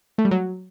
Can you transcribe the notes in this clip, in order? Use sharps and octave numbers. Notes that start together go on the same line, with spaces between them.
A3
G3
F#3